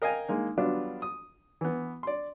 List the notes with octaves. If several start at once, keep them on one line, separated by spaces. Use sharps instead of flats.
A#4 D#5 F5 G5 G#5
G#3 A#3 D#4
F#3 G3 B3 D4 F4
D#6
E3 B3
D5 C6